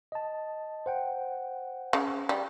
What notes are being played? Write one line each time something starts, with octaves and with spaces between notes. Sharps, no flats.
D#5 A5
C5 F#5 G5
C#3
G3